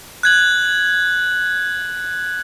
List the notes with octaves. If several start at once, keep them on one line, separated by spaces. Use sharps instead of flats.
F#6 G#6 F#7